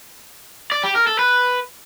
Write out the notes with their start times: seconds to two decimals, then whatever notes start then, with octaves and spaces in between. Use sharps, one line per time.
0.72 D5
0.83 G4
0.95 A#4
1.07 A4
1.19 B4